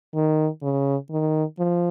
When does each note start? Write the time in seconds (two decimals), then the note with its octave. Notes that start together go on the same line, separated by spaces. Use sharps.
0.15 D#3
0.62 C#3
1.10 D#3
1.59 F3